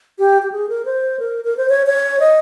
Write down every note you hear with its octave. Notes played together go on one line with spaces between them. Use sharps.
G4
G4
G#4
A#4
C5
A#4
A#4
C5
C#5
C#5
D#5